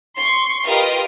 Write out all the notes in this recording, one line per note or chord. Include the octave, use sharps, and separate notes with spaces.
C6 C#6
F4 G4 A#4 B4 D#5 F5